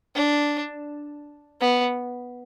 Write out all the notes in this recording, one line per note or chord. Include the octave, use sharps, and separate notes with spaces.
D4
B3